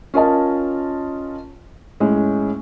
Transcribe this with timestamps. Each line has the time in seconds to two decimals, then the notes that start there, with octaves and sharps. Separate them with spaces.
0.14 C#4 F4 A#4 D#5 A5
2.00 A2 G#3 C#4